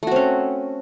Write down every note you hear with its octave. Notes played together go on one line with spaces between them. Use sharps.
A3 C4 C#4 F#4